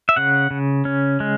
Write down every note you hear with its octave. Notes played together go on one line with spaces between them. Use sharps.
E5
C#3 F#5
C#3
C#4
G#3